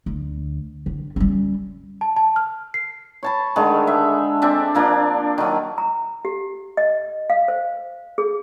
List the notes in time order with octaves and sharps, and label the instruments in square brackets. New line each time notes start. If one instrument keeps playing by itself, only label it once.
[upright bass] D2
D3
G3 C#4
[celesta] A5
A5
F6
C7
[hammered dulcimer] C#5 A5 B5
D3 D#3 G#3 A3
E5
C4 D4 D5 E5
F3 A#3 D4
D#3 F#3
[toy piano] A#5
G4
D#5
F5
C5
G#4